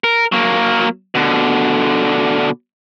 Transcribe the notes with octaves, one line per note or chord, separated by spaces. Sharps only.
A#4
F#3 A#3
B2 D3